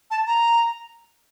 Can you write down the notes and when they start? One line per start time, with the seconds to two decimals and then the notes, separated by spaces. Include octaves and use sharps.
0.11 A5
0.27 A#5